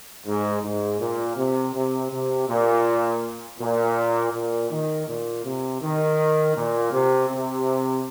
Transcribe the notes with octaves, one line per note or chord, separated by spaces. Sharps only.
G#2
G#2
A#2
C3
C3
C3
A#2
A#2
A#2
D#3
A#2
C3
D#3
A#2
C3
C3